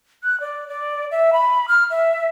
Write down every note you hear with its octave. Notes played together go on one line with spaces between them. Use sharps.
F#6
D5
D5
E5
B5
F6
E5